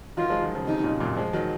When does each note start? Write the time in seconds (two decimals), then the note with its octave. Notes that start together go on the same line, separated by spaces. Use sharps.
0.17 D#3 F#3 F4
0.30 F3 G#3
0.42 D#3 F#3
0.55 C#3 F3
0.67 C3 D#3 D#4
0.84 A#2 C#3
1.00 F#2 A#2
1.17 F3 G#3
1.33 D#3 F#3